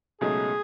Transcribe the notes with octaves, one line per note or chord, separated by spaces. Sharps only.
C#2 B2 F#3 A3 D#4 G#4